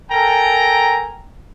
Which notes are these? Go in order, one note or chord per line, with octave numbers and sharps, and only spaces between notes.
A4 A#4 G5 G#5 A#5